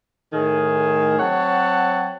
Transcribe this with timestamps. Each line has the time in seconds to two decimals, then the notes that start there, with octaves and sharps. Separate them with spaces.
0.33 A2 D#3 G#4
1.19 F#3 C4 C#5 F#5 G5 A5